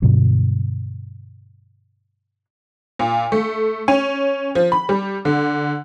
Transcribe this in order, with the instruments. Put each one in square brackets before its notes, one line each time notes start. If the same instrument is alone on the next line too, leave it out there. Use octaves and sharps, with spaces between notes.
[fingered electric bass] G2 B2 D3 F#3
[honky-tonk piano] A#2
A3
C#4
F3
B5
G3
D3